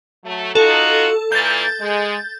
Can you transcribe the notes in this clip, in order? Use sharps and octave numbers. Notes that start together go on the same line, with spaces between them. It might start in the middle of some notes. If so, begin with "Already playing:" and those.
F#3 A3
D#4 F4 F#4 A4
A#2 E3 A#3 G6 A6
G#3